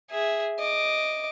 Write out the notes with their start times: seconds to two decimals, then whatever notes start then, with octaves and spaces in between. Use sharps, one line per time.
0.11 G#4 E5
0.59 D#5 D6